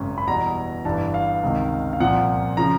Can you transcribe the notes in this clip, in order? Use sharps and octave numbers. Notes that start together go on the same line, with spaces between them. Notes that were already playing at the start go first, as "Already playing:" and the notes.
Already playing: G#1 F#2 C#3
B5
E2 B2 G3 A#5
G1 G2 E3 G3 A5
F5
C#2 C3 D#3
F5
C2 A#2 F3 F#5
C#3 F3 A#5